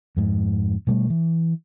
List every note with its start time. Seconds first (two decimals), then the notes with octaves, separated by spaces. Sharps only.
0.17 F2 G#2
0.87 B2 G3 A3
1.10 E3